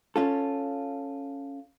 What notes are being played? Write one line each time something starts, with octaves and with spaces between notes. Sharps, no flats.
C#4 F4 A4